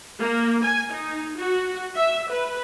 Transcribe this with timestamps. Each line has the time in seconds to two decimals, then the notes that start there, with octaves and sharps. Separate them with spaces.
0.21 A#3
0.65 G#5
0.93 D#4
1.37 F#4
1.95 E5
2.31 B4